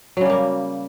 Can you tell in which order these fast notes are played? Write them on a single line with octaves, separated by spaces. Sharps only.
F#3 C#3 G3 A#3